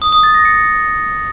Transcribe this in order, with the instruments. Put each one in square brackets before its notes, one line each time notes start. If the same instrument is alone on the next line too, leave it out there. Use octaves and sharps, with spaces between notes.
[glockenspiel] D#6
D#6
A6
A#6
C#7